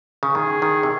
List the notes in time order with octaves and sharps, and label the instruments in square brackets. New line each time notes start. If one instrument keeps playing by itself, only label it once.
[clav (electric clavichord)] C#3
[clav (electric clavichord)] D#3 [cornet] G#4
[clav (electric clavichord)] D#3
C3